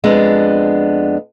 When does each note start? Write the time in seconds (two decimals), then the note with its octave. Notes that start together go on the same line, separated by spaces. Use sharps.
0.04 F2 G#3 B3 D4